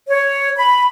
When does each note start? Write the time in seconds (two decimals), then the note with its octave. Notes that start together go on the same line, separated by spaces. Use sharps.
0.09 C#5
0.57 B5